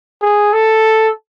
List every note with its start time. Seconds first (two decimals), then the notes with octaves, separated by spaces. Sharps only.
0.22 G#4
0.53 A4